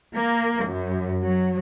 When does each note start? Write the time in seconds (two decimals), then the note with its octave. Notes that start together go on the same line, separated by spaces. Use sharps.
0.15 A#3
0.65 F#2
1.21 F#3